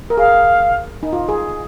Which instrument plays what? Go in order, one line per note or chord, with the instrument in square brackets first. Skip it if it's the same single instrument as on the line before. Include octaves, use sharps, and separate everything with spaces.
[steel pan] A#4
[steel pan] G#4 [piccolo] F5
[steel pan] D#4
F4
G#4